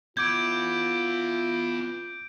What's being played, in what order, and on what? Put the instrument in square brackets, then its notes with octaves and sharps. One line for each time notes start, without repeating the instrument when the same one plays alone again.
[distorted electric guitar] B3 E4 [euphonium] F4 [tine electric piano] D6 G#6 [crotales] G6 D7